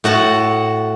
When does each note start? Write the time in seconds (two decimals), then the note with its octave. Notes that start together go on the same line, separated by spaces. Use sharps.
0.04 A2 F#4 F#5 A5